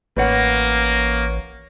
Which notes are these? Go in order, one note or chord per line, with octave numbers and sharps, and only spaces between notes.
A1 A#3 B4 C#5 F#5